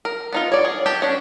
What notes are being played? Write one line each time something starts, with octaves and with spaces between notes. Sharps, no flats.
A#4
B3 D#4 F4
C#5 D5
G#4
G4 G5 A5
C#4 D4